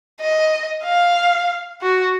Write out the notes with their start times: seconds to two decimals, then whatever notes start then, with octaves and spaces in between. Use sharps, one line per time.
0.20 D#5
0.84 F5
1.82 F#4